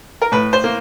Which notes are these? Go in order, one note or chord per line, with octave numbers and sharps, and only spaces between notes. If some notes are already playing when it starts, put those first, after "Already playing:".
A#4
A2 B4
C5
A#3